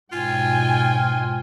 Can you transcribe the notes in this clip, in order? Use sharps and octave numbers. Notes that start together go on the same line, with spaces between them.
G#2 B2 F4 G5 G#5